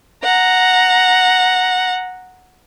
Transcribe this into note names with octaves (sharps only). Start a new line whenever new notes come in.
F#5 A#5